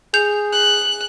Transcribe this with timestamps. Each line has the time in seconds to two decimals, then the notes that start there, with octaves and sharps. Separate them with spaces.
0.14 G#4 G6 F7
0.52 F#6